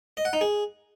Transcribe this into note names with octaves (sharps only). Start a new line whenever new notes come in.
D#5
F#5
D#4
G#4